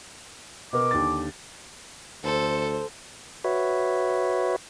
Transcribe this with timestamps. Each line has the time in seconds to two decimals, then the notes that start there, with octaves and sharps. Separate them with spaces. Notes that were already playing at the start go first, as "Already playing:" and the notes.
0.73 B2 B3 A#4 D6
0.91 D#2 D3 A6
2.24 D2 A4 C5
3.44 F#4 B4 C#5 E5